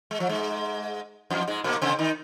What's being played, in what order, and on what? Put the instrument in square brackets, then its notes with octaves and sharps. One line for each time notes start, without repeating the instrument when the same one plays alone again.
[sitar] G#3
F3
G#2 G#3
F2 F3
G#2 G#3
A#2 A#3
C3 C4
D#3 D#4